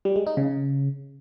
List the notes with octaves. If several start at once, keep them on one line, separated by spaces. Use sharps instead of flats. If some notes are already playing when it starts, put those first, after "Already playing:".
G3
G#3
D#4
C#3